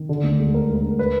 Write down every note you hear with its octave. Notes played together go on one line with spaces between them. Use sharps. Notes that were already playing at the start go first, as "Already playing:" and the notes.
Already playing: D#3
D3
D2
G#3
D2 A#4
G#3
A#4
D2
B4